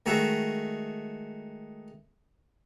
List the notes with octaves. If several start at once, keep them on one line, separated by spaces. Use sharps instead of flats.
D#3 G#3 A3 F#4 E5